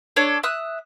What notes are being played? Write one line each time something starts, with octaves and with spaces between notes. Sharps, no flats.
D4 A4 C#5
E5 D#6 F#6